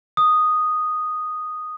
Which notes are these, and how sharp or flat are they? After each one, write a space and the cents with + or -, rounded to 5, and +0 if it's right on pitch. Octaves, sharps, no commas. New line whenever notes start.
D#6 -5